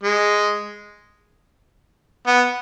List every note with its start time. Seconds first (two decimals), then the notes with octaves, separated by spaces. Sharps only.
0.03 G#3
2.27 B3